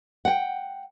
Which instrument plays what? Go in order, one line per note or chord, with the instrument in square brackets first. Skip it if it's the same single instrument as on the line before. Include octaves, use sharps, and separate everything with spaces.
[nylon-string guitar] F#5 G5